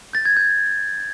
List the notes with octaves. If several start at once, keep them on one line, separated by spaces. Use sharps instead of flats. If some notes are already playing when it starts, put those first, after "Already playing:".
G6 A6
G#6
G6